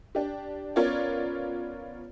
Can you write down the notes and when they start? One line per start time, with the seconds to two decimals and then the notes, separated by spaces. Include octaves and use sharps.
0.15 D4 G4
0.76 B3 C#4 F4 A#4 C#5 D5